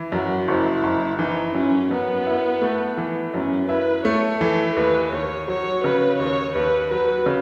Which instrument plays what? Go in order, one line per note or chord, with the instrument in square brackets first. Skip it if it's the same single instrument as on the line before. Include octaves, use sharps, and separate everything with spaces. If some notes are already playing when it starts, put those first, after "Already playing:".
Already playing: [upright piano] E3
[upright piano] F#2 [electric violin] F#4
[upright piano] F#1 [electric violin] E4
[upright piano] F#1
[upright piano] E3 [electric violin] D#4
[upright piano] F#2 [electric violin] C#4
[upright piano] F#2 [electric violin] B3
[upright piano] E4
A3
E3
[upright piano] F#2 [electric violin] C#4
[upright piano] E4 [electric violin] B4
[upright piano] A3 [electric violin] C#5
[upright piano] E3 [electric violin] A4
[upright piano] D#2 [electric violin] B4
[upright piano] D#2 [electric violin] C#5
[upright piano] F#3 [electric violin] C#5
[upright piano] C#3 [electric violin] B4
[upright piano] D#2 [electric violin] C#5
[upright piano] D#2 [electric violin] B4
[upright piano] F#3 [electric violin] B4
[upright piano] C#3